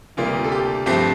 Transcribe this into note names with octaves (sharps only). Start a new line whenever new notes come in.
D2 C3 G3 A#3 F4
A4
G4
G2 F3 A3 C4 G4